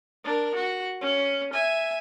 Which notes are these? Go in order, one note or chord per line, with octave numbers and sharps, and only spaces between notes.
D4 A#4
F#4
C#4
E5 G#5